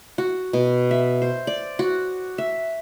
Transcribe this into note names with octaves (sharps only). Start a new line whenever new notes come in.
F#4
B2
E5
C5
D5
F#4
E5